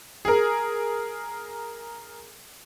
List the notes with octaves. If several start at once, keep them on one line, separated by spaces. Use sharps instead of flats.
G#4 A#4